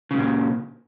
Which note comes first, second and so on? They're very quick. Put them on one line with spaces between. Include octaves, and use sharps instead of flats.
C#3 G2 A#2